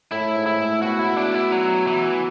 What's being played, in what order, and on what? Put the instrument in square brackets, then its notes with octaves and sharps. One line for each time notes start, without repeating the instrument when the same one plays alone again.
[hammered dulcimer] A2 [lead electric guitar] E4
[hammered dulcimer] G#2
[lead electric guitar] E4
[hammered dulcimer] A2
[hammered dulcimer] B2 [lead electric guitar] F#4
[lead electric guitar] E4
D4
E4
F#3
E3